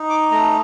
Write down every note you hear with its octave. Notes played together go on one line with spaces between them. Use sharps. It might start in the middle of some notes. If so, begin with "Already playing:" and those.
Already playing: D#4
D6
A3 A#5